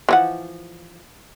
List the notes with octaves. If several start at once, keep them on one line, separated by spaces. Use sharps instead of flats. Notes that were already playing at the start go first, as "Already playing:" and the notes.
E3 F3 F#5